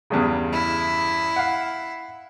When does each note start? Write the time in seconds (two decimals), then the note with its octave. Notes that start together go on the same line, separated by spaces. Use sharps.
0.10 E2 G2 C#3
0.53 E4
1.36 F5 F#5